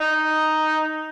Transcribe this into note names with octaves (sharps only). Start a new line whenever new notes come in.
D#4